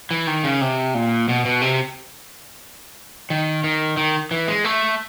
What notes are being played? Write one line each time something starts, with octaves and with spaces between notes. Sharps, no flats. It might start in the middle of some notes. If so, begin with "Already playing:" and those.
E3
D#3
C#3
C3
A#2
B2
B2
C3
D#3
D#3
D#3
E3
G#3
A3